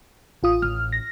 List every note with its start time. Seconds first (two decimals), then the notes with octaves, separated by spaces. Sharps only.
0.43 A1 F4 D#6
0.62 A1 F6
0.93 A#6